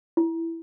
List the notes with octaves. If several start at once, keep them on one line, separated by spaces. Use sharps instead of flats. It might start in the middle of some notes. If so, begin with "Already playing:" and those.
E4